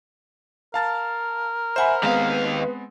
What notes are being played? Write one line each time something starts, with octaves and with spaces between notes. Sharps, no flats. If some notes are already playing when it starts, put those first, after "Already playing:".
A#4 F5 A5 A6
C5 E5 F#5 G#5 B5
D#2 G#3 B3 C4 B4 F5